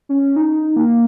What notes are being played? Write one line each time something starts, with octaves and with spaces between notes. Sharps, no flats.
C#4
D#4
A#3